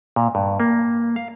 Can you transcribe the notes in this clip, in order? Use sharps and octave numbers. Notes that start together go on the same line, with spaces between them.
A#2
G2
A#3
F5